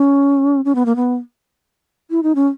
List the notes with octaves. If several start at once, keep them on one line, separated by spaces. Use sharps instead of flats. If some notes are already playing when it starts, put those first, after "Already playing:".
Already playing: C#4
C#4
B3
A#3
B3
E4
D#4
C#4